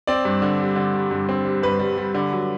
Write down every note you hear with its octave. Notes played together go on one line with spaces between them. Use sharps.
C4 D5
G2
D3
G3
D3
G3
G2
C4
G3
G2 B4
G3
G3
D3
F#3